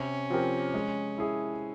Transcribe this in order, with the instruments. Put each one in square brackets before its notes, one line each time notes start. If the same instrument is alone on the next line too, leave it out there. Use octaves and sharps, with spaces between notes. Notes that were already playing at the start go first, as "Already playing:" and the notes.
Already playing: [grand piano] C3 [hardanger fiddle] C#4
[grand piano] F3 C4 G4 A#4
G#3
E4 G#4